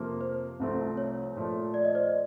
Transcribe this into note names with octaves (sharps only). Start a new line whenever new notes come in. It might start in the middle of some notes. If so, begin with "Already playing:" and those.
Already playing: F2 C3 F3 A#3
C5
C2 C3 F3 A3 C4
C#5
A#2 F3 A3
D5
D#5
C5 D5